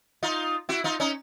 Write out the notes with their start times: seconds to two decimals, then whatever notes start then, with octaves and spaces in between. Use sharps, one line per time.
0.23 D#4 F4
0.69 E4 F#4
0.84 D#4 F4
1.00 C#4 D#4